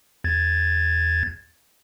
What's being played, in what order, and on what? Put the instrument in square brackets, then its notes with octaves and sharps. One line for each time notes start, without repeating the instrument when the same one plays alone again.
[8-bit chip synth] E2 G#6 A6